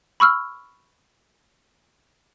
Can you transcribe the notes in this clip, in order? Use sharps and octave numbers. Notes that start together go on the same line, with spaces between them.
B5 C#6 E6 F6